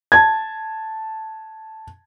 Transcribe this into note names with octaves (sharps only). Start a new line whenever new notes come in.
A5 G#6